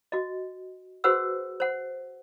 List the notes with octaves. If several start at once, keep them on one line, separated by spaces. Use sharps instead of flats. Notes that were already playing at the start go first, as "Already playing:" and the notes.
F#4 D#5
F#4 G#4 B4 C5 F#5 E6
C5 F#5